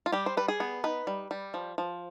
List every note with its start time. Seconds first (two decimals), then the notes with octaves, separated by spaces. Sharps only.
0.06 F4
0.12 G3 G4
0.26 C5
0.37 G3 B4
0.48 G#4
0.60 B3
0.84 D#4 B4
1.07 G3
1.31 G3
1.54 F3
1.78 F3